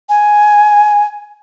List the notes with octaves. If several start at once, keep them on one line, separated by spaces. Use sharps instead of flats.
G#5